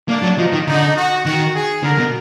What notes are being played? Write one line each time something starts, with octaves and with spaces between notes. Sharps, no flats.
A#3 D4
F#3
F3 D#4
D#3
D3 D#4
F#4
D#3 F#4
G#4
D3 A#4
B2